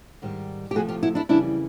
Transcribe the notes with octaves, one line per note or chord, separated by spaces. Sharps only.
G#2 D#3 G3
G4
D2 C3 F3 A3 F#4 G#4
F4 G4
E4 F#4
D4 E4
F2 C#3 E3 G3 D4 E4